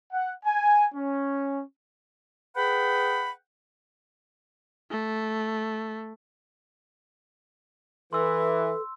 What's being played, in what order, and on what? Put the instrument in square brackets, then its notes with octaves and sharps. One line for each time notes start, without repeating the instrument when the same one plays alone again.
[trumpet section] F#5
G#5
C#4
[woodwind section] G#4 B4 F#5 G5 B5
[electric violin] A3
[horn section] E3 [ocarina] A4 [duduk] B4 [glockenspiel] C6 E6